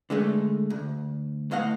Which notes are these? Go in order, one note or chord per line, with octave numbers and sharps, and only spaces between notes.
D3 G#3 A3
D2
A2 A3 D#5 F5 F#5